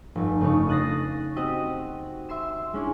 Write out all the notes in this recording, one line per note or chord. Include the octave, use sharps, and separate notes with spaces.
F1 G2
C#3 A3 D4 D#4 C#5
D#6 F#6 A6 A#6 C7
C4 F#4 G4 D#5 F#5
E5 C6 C7 E7
G#3 C#4 D4 E4